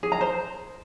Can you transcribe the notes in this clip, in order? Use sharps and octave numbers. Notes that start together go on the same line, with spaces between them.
G#4
A#5
C5